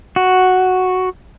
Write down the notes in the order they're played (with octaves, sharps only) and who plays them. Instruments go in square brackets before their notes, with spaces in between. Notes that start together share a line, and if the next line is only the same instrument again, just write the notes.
[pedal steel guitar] F#4